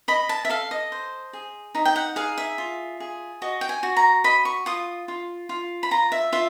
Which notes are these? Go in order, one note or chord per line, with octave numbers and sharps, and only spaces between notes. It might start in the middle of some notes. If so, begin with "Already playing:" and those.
D#5 B5
A5
E5
A4 F5
D#5
C5
G#4
D#4 E5
G5
F#5
G#4 F5
E5
F4
G#4
F#4 D#5
G5
G#5
F#4
A#5
D#5 B5
C#6
F4 D#6
F4
F4
B5
F4 A#5
E5
F4 E5